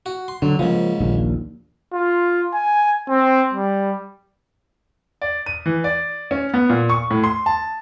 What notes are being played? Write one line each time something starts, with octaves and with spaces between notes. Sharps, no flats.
F#4
C6
D3 F#3
G#2 C#3 F3 A3 A#3
A#1 D#2 A#2
F4
G#5
C4
G3
D5
D#7
E3
D5
C#4
B3
A#2
C#6
A2
C6
A5